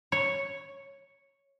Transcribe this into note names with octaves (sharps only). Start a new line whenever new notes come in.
C#5